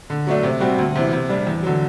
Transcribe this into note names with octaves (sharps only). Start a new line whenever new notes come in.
D3
F#3 A3 D4
C3
G3 C4 F#4
D2
C3 E3
C3
G3 D4
E2
D3 F#3